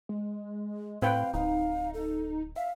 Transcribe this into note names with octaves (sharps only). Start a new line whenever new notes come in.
G#3
A2 C4 B4 F5 G5
D1 D#4 F5
A4
E5 F5